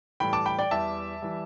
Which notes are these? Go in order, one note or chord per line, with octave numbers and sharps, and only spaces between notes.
A2 E3 G3 G5 B5
A5 D6
G5 B5
D5 G5
E2 E3 G3 E5 A5
E3 G3